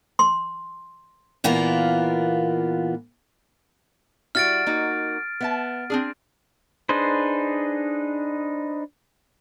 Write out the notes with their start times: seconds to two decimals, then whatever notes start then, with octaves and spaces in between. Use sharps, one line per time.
0.19 C6
1.44 A#2 E3 A#3 B3 F4
4.35 G3 E4 F#4 F6 A6 D7
4.67 A#3 D#4 F#4
5.41 B3 E5 A5
5.90 C4 D4 G#4
6.89 D4 D#4 G#4 B4 C5